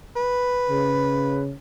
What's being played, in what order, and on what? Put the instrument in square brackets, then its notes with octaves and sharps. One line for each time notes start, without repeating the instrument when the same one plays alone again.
[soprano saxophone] B4
[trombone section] C#3